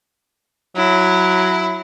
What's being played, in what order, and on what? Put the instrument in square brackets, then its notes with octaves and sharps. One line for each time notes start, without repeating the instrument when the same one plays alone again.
[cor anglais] F#3 [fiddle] E4